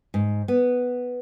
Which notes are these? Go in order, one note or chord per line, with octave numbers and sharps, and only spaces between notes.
G#2
B3